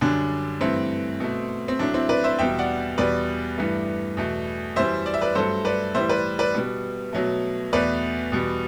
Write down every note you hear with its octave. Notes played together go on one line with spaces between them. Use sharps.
F#2 D3 G3 D4
G2 E3 A3 C4
B2 A3
C4
A2 F#3 A3 D4
C4 E4
B4 D5
C5 E5
E2 B2 G3 E5 G5
D5 F#5
E2 B2 G3 B4 D5
G2 E3 A3
E2 B2 A3
F#2 E3 G3 C5 E5
D5
E5
B4 D5
G2 F#3 A3 A4 C5
B4 D5
A2 E3 G3 C5 E5
B4 D5
B4 D5
B2 G3
B2 F#3 A3
E2 B2 A3 B4 D5
E2 B2 G3